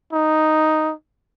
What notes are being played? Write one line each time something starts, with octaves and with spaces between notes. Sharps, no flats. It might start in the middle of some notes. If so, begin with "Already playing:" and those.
D#4